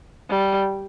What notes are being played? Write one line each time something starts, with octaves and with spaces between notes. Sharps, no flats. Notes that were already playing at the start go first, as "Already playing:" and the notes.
G3